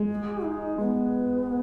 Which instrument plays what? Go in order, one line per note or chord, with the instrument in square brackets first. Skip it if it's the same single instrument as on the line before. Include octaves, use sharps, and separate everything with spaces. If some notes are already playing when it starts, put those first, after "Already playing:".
Already playing: [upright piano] G#3
[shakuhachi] G#4
D#4
[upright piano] G#3 [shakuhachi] B3